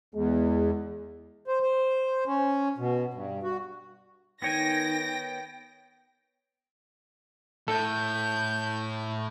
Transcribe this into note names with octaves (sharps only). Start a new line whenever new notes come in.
E2 G#3
C5
C5
C#4
B2
G2
F#4
D#3 B3 C#5 G5 G#5 A#6
A2 A4 G6